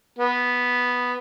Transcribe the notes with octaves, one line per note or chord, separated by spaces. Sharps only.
B3